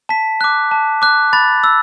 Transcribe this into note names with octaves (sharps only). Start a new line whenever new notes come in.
A5 B6
D6 F#6
A5
D6 F#6
B5 A6
E6